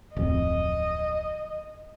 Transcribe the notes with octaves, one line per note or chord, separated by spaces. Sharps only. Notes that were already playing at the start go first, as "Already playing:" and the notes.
D1 F2 D#5